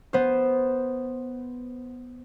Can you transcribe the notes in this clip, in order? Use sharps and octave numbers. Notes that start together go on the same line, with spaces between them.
B3 C5